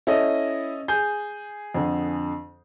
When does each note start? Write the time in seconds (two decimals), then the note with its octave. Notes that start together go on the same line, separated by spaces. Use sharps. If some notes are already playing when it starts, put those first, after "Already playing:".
0.07 C#4 E4 A4 D#5
0.88 G#4 G6
1.75 F2 D3